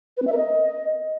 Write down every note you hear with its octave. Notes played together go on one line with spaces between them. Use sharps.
B4
C4
E5
A#4
D#5